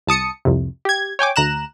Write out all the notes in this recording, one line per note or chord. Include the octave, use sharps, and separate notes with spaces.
C2 A5 D#6 C#7
C2 F2 C3
G4 G#6
C#5 G5 G#5 D6
D2 A#5 F#6 E7